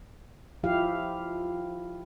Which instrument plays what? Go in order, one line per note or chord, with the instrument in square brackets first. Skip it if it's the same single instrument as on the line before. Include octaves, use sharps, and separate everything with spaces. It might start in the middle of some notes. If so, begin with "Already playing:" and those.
[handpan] F3 E4 G4 F5